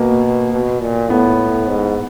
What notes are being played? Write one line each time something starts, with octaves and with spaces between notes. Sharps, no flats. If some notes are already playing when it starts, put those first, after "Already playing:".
Already playing: B2 A#3
B2
A#2
A2 B3
G#2